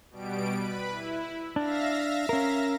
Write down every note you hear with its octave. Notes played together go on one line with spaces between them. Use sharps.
B2 G3 D7
B4 B5
E4
D4 E5 F5 A#6
C#4 A#4